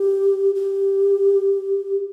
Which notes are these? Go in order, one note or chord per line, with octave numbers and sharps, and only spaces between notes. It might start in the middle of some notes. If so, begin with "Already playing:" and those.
Already playing: G4
G4